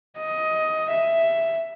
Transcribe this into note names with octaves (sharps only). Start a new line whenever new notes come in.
D#5
E5